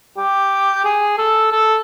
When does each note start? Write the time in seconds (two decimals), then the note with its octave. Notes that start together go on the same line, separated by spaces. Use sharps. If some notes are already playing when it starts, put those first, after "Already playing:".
0.17 G4
0.85 G#4
1.18 A4
1.52 A4